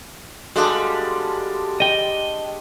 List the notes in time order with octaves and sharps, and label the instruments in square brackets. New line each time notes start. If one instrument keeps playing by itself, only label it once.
[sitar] G3 [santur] G#3 D4 [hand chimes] F#4 A4 F5
[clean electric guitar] D#5 G5